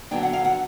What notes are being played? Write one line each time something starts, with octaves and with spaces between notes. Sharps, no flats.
D3 F#3 B3 D4 G5
F#5
F5
F#5